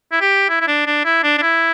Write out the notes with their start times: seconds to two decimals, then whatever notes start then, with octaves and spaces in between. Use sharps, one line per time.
0.12 E4
0.21 G4
0.49 E4
0.61 E4
0.67 D4
0.86 D4
1.05 E4
1.23 D4
1.38 D4
1.42 E4